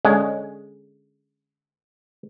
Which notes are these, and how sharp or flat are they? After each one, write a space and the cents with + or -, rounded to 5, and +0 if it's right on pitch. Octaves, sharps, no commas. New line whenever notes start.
D3 +0 G#3 +0 C#4 +0